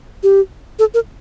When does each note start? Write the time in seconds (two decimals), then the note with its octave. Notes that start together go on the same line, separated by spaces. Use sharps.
0.23 G4
0.79 A4
0.94 A#4